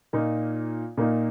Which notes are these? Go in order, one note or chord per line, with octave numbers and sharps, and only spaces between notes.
A#2 A#3 D#4
A#2 A#3 D#4